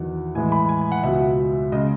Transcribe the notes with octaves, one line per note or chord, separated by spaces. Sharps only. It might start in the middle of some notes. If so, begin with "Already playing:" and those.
Already playing: E2 D#3 F#3 F#5
A2 E3 G#3 G#5
B5
G#5
G#5
F#5
C#2 B2 F#3 E5
C#3 G#3 D#5